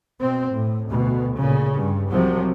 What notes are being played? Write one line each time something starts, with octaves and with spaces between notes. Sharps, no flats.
B2 C4
A2
D2 B2
A#2 C#3
G2
C2 C3 F3 F#3